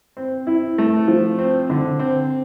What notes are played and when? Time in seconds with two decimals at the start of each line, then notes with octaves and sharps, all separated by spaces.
0.17 C4
0.47 E4
0.78 A3
1.08 F3
1.39 C4
1.70 D3
1.99 C4